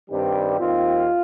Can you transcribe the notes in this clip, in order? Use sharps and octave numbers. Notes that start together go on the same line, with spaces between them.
G2 D#3 G3 C4 G4
D#2 D#3 C4 F4